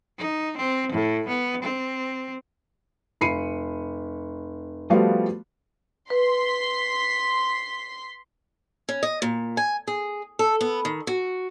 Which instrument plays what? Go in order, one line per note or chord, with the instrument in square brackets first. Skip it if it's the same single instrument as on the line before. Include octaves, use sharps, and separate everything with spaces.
[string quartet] D#4
C4
A2
B3
C4
[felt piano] F1 B5 C7 C#7 D#7
F3 G3 A3 B3 F4 F#4
[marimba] B4 [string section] C6 B6
[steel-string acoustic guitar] C#4
D#5
A#2
G#5
G#4
A4
B3
D#3
F#4